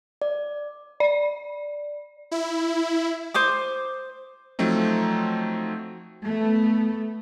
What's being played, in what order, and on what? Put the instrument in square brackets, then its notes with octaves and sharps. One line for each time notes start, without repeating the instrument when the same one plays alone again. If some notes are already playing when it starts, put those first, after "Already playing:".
[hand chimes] D5
[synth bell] D5
[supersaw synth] E4
[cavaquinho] C5 D6 D#6
[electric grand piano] F3 F#3 A3 C4 D#4
[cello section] A3 B3